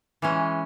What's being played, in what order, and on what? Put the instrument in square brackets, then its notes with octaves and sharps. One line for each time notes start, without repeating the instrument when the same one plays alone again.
[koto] E3 G#3 C#4